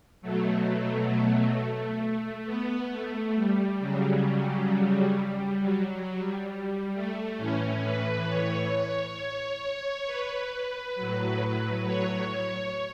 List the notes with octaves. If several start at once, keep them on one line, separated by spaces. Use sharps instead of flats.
B2 F#3 A3
A3
B3
A3
G3
C#3 F#3
F#3
F#3
G3
G3
A3
A2 E3 C#4
B4
C#5
B4
A2 F#3
C#5
C#5